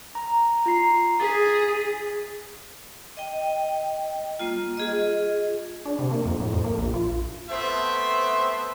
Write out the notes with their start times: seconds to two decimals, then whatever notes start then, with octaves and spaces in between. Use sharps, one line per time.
0.15 A#5
0.66 F4 A#5 C7
1.20 G#4 A6 B6
3.17 D#5 G5
4.39 G3 A#3 F4
4.77 F4 G#4 D#5
5.85 D4
5.99 C3
6.11 A#3
6.26 F2
6.40 A2
6.53 F2
6.64 A#3
6.78 A#1
6.94 F4
7.50 A3 B3 C4 C5 E5